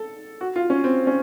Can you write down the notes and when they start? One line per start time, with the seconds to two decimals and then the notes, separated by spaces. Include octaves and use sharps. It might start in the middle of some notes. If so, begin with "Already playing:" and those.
Already playing: A4
0.41 F#4
0.56 F4
0.70 C#4
0.84 C4
1.07 C#4